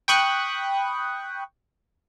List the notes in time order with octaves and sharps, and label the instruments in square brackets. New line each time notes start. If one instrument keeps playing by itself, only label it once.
[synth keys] G5 B5 C#6 D#6 F#6